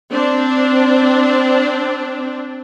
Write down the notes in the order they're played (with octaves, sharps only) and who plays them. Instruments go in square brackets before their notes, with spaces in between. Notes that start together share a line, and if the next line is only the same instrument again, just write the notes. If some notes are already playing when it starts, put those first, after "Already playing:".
[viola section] C4 D4